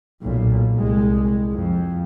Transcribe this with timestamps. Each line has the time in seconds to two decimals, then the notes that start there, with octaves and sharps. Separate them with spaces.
0.22 B1 A#2
0.75 C2 G#3
1.52 F2